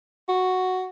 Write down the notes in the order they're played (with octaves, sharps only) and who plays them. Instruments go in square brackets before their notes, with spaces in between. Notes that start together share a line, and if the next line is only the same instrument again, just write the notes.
[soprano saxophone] F#4